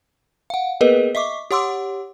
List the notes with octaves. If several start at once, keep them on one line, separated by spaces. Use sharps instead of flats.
F5 F#5
A#3 B3 G#4 A#4 B4 D#5
D#5 E5 C#6 D6
G4 C#5 F#5 C6 D6 E6